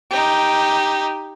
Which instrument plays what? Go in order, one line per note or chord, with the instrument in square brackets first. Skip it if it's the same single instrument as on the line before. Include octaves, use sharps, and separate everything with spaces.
[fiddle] D#4 G4